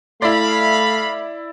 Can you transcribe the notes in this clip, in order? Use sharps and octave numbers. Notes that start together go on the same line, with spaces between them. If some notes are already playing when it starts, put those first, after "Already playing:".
A3 E4 D5 F5 B5